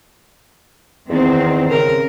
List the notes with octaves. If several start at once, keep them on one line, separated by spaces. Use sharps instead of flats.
E2 D#3 C4
C#3 A#4